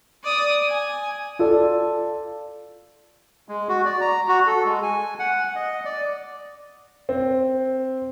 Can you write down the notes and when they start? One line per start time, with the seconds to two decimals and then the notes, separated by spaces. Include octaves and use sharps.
0.24 D5 D#6
0.68 G#5
1.39 F4 A4 D5
3.49 G#3
3.69 F#4
3.85 D5
4.01 A#5
4.28 F#4
4.47 A4
4.65 G#3
4.82 G#5
5.19 F#5
5.56 D#5
5.85 D5
7.09 C4